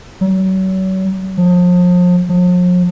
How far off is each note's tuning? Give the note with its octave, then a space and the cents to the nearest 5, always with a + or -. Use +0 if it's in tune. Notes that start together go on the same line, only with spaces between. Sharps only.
F#3 +35
F3 +35
F3 +45